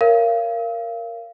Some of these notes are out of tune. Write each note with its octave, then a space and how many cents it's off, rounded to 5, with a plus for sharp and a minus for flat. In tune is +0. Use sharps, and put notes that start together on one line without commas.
A#4 -5 C#5 -5 F5 -25